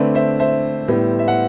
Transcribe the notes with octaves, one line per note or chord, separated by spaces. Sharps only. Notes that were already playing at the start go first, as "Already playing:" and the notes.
Already playing: D3 A3 C4 B4 D5
C5 E5
C5 E5
A2 G3 B3
E5
F#5